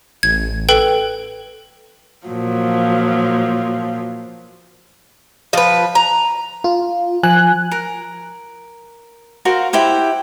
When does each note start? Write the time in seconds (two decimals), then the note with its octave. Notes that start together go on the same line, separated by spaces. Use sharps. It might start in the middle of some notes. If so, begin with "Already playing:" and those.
0.23 A1 G#6
0.69 A4 B4 G5
2.27 A#2 F3 F#3
5.53 F3 B4
5.95 A#5
6.64 F4
7.23 F3 G#5 F#6
7.71 A#4
9.45 F#4 A#4 C5 F5
9.73 E4 G4 C5 F#5